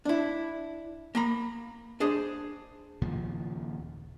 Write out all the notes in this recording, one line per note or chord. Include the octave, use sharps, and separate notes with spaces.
D4 E4
A#3 A#5 B5
D4 G#4 C5
D#2 A#2 C#3 F3